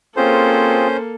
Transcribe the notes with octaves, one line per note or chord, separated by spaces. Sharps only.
A#3 C4 C#4 F4 G#4 A4 C5